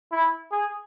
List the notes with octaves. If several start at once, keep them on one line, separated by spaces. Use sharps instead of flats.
E4
G#4